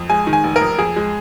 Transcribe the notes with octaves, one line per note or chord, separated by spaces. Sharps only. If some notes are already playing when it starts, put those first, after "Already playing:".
Already playing: F2
G#3 G#5
D#3
G#5
F1
A#4
F2
F2 G#4
G#3